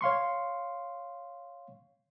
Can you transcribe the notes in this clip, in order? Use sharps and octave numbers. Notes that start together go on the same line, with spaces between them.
C#5 F5 C6 C#6